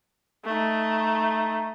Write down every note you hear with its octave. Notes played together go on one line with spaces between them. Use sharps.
A3 D#4